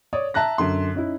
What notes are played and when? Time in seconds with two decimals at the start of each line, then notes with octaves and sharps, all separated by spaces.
0.13 C#5 D5 D#6
0.34 E5 A5 A#5 F#6 A#6
0.58 F#2 D3 C6
0.95 C#4 D#4 E4